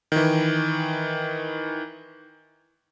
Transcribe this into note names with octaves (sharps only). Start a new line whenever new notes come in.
D#3 E3